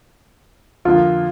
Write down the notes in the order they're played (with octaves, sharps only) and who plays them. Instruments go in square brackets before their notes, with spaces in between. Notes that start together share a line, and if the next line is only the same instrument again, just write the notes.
[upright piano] F2 D3 F3 A#3 [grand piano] F4